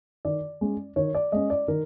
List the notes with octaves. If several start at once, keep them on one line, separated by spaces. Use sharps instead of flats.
D#3 D5
G#3 C#4
D#3 C#5
D5
G#3 C#4 D#5
D5
D#3 A#4